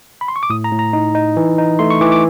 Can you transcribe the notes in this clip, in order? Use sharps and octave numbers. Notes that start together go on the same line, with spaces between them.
B5
C6
C#6
D6
A2 D#6
A#5
A2
A#5
D#4
D#4
E3
D#4
A3 C6
C#6
E3 D6
D6